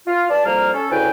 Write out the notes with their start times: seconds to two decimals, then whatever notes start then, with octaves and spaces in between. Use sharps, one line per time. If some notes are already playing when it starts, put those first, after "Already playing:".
0.07 F4
0.30 G2 D5 A5
0.45 C2 F2 G3 A#3 F5 A#5
0.74 C#4 A4
0.90 D2 C#3 E4 B4 G5 G#5